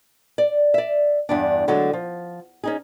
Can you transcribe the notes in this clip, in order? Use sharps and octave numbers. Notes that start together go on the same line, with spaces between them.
D5
D5 E5
E2 G2 D4
D3 F#3 G#3 A3 A4
F3
C#4 D#4 G#4